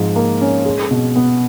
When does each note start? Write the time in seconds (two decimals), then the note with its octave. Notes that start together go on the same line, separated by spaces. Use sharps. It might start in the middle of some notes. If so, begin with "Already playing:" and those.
Already playing: G#2 F3
0.16 A#3
0.41 C#4
0.65 G#3
0.91 B2
1.16 B3